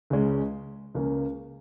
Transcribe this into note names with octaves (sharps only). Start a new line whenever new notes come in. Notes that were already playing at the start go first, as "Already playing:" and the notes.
C#2 C#3 G#3 C#4
C#2 C#3 A#3 C#4